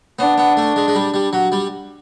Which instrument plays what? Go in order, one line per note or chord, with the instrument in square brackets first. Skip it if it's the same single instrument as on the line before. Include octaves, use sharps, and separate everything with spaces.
[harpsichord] B3 [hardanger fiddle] D4
[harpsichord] B3
A3
G#3
G#3
G3
G3
F#3
G3